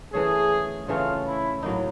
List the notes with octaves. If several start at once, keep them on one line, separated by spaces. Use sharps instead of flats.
E3 A3 C#4 G#4
C#3 E3 A3 C#4 F4
E4
A2 F#3 A#3 D#4